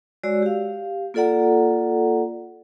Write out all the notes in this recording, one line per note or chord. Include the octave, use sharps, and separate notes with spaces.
G#3 F#4 C#5 D5 E6
G4 F5
A#3 F4 A4 D5 F#5 A#5